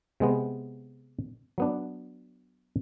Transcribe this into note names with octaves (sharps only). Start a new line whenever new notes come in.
C3 G#3 B3
F#3 B3 D4